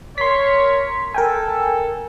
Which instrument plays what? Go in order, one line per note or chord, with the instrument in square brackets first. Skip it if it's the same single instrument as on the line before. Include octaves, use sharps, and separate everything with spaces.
[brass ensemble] A#4 C#5 [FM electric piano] C6 B6
[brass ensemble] A4 [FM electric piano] A#4 G5 G#5